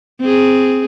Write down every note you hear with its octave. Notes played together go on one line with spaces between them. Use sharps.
C4 G#4